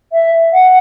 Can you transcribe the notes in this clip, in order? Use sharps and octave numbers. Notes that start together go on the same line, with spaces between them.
E5
F#5